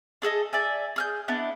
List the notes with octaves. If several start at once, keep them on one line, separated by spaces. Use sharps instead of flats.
D4 G#4 A4 D#5
D5 E5 G#5
G#4 F6 G6
B3 D4 E4 D#5